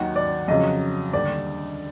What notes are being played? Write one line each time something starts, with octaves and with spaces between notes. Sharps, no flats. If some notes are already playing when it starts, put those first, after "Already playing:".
Already playing: D#2 D#3 F#3 F#5
D5
F2 C#3 F#3 D#5
D#2 D3 G3 D5